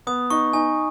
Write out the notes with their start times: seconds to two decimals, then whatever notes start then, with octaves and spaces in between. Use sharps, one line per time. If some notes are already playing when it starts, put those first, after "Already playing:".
0.07 B3 D#6
0.30 D#4 C#6
0.53 D#4 G#5